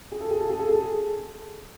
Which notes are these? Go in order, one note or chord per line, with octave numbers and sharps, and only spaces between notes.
G#4
A4
G#4
A4
G#4
A4
G#4